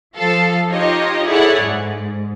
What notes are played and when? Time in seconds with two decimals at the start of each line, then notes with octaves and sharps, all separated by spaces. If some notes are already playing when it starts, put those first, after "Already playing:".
0.17 F3 A4 F5
0.70 D#4 F4 G4 C#5 D#5
1.27 E4 G#4 A4 C#5 D5 F#5
1.62 G#2